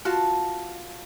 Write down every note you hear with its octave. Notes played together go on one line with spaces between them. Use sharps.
F4 F#4 A5